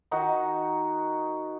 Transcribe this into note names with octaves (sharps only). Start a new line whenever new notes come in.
D#3 D#4 F#4